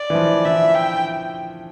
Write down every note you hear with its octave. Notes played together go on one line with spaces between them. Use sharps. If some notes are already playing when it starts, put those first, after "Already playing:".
Already playing: D5
E3
F3
E3 E5
G5